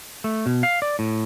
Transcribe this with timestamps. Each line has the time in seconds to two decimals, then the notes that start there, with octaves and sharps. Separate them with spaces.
0.24 A3
0.46 B2
0.63 F5
0.82 D5
0.99 A2